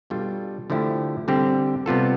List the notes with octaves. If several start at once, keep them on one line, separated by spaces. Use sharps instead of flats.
B2 G3 D4 F4 A4
D3 F3 A3 E4 G4
D3 G3 C4 G4
C3 G3 B3 F4 A4